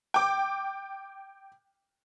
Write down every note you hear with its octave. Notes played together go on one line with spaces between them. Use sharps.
G5 D6